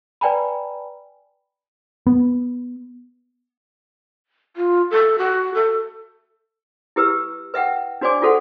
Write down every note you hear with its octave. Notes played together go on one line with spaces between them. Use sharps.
B4 D5 G5 G#5 A#5 B5
B3
F4
A4
F#4
A4
E4 G4 B4 E6
B4 E5 F#5 G5
D4 F#4 C5 D5 G#5 D6
F4 F#4 A4 C5 F#5